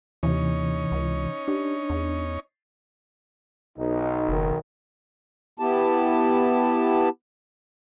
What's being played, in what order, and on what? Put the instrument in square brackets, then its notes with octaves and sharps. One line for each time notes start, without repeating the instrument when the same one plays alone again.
[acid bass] D#2 [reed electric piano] C3 E3 [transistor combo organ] C#4 D#4 C#5
[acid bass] C#2
[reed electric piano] D4 [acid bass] G4
[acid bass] E2
[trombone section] B1 [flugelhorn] D#4
[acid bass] F#1 [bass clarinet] D#3
[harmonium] B3 E4 G4 A5